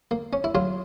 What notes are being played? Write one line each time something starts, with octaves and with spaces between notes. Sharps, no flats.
A#3
C#4
E4
F#3 F4